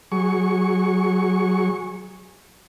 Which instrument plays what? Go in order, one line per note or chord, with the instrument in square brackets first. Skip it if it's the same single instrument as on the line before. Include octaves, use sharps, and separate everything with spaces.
[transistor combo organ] F#3 G#4 C#6